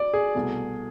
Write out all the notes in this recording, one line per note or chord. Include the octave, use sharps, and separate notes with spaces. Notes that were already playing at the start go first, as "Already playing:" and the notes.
Already playing: D5
G#4
C2 B2 A3